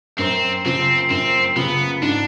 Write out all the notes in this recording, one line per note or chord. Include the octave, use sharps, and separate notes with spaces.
F#2 C4
C#3 F3 C4
F#2 C4
C#3 F3 B3
G#2 D4